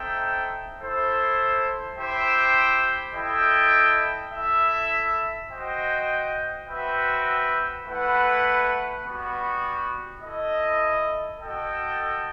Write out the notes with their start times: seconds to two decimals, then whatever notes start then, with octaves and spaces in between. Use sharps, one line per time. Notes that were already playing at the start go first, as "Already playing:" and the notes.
Already playing: C4 D#4 A4 E5 G5
0.78 E4 A4 C5
1.97 E4 G4 C5 E5 G5
3.14 E4 A4 D#5 G5
4.32 E4 A4 E5
5.50 F#4 C5 D#5 G5
6.67 C4 F#4 B4 E5 G5
7.85 A3 E4 B4 F#5
9.03 G3 B3 F#4
10.21 E4 A4 D#5
11.39 F#4 A4 D#5 G5